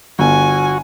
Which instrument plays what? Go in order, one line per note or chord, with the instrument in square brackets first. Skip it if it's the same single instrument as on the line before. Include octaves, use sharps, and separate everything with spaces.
[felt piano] G1 [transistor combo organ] F#4 [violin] G#5